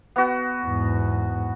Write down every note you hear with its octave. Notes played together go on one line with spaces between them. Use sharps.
B3 F#4
E2 G#2